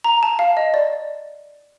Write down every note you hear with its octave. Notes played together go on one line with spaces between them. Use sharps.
A#5
A5
F5
D#5
D5